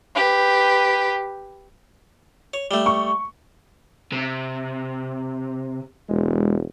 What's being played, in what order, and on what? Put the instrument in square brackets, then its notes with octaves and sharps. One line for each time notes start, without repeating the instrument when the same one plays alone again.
[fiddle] G4 B4
[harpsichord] C#5
G3 A3
[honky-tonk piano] C#6
[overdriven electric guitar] C3
[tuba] E1 [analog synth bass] G#3